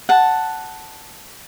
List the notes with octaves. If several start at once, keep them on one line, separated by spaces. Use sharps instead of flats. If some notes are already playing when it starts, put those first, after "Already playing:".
F#5 A5